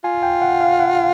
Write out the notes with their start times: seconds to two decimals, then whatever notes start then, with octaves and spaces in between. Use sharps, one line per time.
0.04 F4 G#5
0.23 G5
0.42 F#5
0.61 F5
0.80 F#5